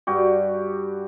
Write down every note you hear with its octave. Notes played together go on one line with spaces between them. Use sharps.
G2 F#4 G4